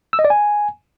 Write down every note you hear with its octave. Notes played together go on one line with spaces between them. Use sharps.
E6
D#5
D5
G#5